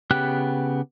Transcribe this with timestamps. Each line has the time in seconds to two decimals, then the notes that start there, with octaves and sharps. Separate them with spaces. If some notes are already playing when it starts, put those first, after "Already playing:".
0.11 C#3 B3 G4 G5 F#6